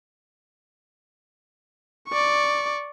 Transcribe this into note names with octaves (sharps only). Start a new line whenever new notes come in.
D5 C#6